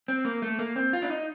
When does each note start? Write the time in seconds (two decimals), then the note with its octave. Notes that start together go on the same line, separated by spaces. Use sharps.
0.08 C4
0.25 A#3
0.42 A3
0.59 A#3
0.76 C4
0.93 F4
1.02 D4
1.10 D#4